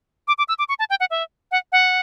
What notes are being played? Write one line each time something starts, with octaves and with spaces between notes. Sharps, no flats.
D6
D6
E6
D6
C#6
A5
G5
F#5
E5
F#5
F#5